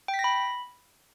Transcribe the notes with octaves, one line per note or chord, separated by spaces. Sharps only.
G5
B6
A#6
B5